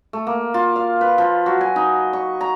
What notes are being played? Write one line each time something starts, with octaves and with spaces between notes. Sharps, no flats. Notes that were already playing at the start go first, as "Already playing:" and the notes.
A3
A#3
F4
F5
B4
F3
F#3
G#5
D#4
C#6
A#5